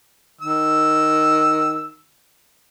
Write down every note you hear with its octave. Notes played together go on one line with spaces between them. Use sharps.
D#3 E6